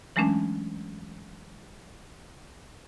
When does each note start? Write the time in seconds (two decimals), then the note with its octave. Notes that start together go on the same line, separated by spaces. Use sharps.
0.16 E3 F#3 G#3 A3 C#4 D4